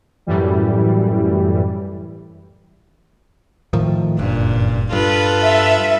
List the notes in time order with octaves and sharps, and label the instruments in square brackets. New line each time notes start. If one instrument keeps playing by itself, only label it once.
[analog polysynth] F#2 A2 E3 G3
[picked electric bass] A2 D#3 F3
[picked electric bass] F#1 G2 [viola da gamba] A#2
[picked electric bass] G2 [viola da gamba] F4 A4 B4
[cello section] E5